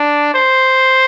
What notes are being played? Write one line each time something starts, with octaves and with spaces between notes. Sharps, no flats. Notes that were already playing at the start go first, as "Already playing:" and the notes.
Already playing: D4
C5